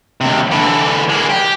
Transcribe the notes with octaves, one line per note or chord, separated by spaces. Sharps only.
D#2 C3
D3 E3
G#3 A#3
G4